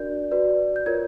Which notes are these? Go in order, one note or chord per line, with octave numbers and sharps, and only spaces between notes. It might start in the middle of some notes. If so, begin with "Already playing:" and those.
Already playing: D4 F#4 A#4 D5 G6
F#4 B4 D5
G6
F4 A#4 C#5 G#6